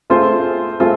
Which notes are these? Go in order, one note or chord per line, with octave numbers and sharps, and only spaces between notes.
A3 C4 F4 G#4 C5
A3 C4 F4 G#4 C5